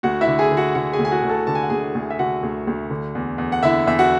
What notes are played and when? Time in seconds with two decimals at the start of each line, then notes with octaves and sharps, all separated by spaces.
0.03 D2 F#4 F#5
0.21 E4 E5
0.27 D3
0.39 G#4 G#5
0.51 D3
0.57 F#4 F#5
0.75 D3 F#4 F#5
0.93 G#4 G#5
0.99 D2
1.05 G#5
1.11 F#4 F#5
1.23 D2
1.29 A4 A5
1.47 D3 A5
1.55 G#5
1.63 F#5
1.70 D2 G#4 G#5
1.95 D2
2.10 E5
2.19 D3 F#4 F#5
2.43 D2
2.67 D2
2.90 D3
3.15 E2
3.38 E2
3.52 F#5
3.63 D3 E4 E5
3.87 E2 E5
3.99 F#4 F#5